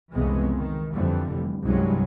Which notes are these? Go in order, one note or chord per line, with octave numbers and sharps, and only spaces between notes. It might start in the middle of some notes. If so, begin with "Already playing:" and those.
C2 F2 C#3 E3 G#3 B3
D#3
F2 D3 E3 G3
F1
C2 G2 F#3 G#3 C4 C#4